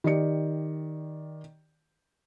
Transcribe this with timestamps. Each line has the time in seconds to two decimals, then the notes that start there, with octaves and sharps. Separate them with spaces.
0.04 D#3 G4 D5 C#7